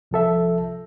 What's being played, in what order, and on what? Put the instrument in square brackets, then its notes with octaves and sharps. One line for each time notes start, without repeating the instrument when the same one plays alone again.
[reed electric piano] C2 F3 A4 E5